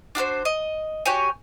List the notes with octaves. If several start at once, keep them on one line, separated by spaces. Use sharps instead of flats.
D4 F#4 A#4 C5
D#5
F#4 G4 C#5 G#5